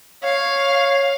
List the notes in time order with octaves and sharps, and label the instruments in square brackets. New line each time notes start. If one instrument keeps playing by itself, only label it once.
[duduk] C#5 [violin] F5